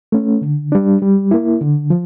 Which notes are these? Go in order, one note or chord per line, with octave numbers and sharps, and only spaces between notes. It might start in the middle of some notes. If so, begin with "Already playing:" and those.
A3 C#4
D3
G3 D4
G3
A#3 E4
D3
F3